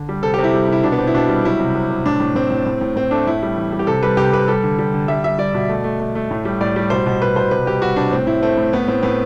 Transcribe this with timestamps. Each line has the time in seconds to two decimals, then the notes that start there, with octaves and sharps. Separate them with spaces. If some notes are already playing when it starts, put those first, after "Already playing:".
Already playing: D3
0.09 G3
0.23 C3 A4
0.34 G4
0.39 C3
0.44 E4
0.54 G3
0.68 C3 E4
0.83 B2 D4
0.92 B3
0.99 B2 C4
1.07 E4
1.15 B2 D4
1.29 G3
1.45 F#3 E4
1.60 C3
1.75 C3
1.90 C3
2.06 A2 D4
2.20 A2
2.35 A2 C4
2.51 A2
2.66 A2
2.81 A2
2.96 A2 C4
3.11 A3 D4
3.27 A2 E4
3.42 G3
3.57 E3
3.72 G3
3.79 G4
3.87 C3 A4
4.03 G3 B4
4.17 C3 G4
4.32 C3 B4
4.48 G3 A4
4.63 D3
4.79 G3
4.93 D3
5.08 G3 E5
5.24 G3 E5
5.39 G3 D5
5.54 B2
5.69 A3
5.84 A3
6.00 A3
6.15 A3
6.31 A2
6.45 G3
6.61 A2 D5
6.76 G3
6.90 B2 C5
7.06 B2
7.22 B2 B4
7.36 B2 C5
7.51 C3 B4
7.66 G3 G4
7.81 G3 F#4
7.96 C3 D4
8.12 A2 C4
8.27 A2 E4
8.42 A3 C4
8.58 A2
8.73 A2 B3
8.88 A2 C4
9.03 A2 B3